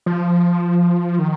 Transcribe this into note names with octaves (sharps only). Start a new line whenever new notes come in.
F3
D#3